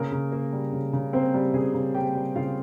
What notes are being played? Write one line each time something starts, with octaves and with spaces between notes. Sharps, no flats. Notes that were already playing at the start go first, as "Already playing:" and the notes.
Already playing: C#3 A#3 A#4
C#3
A#3
G3
C#3
C#3
A#3 C4 C5
G3
C#3 G#4 G#5
C#3
A#3 G4 G5
G3
C#3 F4 F5